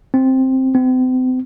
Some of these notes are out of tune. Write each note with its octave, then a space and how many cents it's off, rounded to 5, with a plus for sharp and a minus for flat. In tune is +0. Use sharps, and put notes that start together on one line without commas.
C4 +5
C4 -40